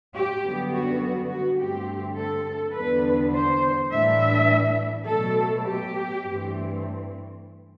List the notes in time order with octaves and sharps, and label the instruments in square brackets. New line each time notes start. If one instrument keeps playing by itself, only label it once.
[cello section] G4
F#2 D3 G3 B3
F#4
F#4
G2 D3 A3 C4 G4
A4
E2 D3 G3 B3 D4 B4
C5
A2 E3 G3 D4 E5
B2 F#3 A3 A4
G4
G2 E3 A3 C4